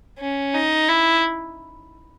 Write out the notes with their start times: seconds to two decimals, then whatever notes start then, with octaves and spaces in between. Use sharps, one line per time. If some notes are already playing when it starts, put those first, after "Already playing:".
0.19 C#4
0.54 D#4
0.89 E4